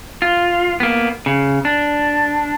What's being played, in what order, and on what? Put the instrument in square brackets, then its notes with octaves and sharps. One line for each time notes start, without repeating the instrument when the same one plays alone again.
[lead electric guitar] F4
A#3 B3
C#3
D4